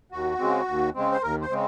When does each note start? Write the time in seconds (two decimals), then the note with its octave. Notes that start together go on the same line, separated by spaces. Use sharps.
0.12 D#2 F#4
0.39 C#3 G#3 C4
0.68 D#2
0.94 C#3 G#3 C4
1.11 C5
1.23 D#2 A#4
1.41 C5
1.50 C#3 G#3 C4